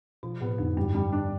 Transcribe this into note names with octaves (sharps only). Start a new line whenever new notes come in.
B2 F3
A2 B3
F2 D3
G2 G3
G3
D4